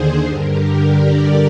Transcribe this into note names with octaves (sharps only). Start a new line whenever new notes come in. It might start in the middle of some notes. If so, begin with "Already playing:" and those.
Already playing: D#2 D3 G#4 C5
G2 D3 G4 A#4
A#4 D5